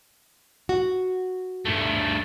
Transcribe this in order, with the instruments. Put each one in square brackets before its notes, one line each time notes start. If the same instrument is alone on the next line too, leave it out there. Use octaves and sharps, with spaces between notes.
[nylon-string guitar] F#4
[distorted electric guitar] G2 A3